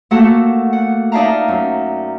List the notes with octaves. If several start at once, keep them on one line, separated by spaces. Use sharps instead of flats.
A3 A#3 F#4 A4 F#5
F#5
D#4 D5 E5 F5 A5 A#5
F#2